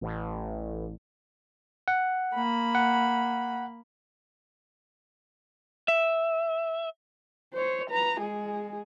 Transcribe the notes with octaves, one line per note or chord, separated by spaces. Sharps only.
A1
F#5
A#3 B5
F#5
E5
C5 C#5
B4 A#5
G#3 G#4